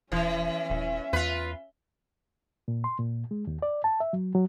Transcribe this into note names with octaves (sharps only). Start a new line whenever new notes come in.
E1 E3 C#4 E5
D#1
E2 F4 B4
A#2
C6
A#2
G#3
D#2
D5
A5
E5
F#3
F#3